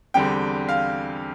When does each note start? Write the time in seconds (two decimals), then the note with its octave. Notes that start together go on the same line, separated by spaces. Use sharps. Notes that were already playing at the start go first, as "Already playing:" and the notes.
0.14 E2 D3 G3 C4 G5
0.68 F5